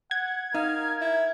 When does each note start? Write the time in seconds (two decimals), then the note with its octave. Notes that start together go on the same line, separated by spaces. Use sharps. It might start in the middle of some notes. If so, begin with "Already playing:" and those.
0.11 F#5 G#6
0.55 D#4 A#4 F5
1.01 E4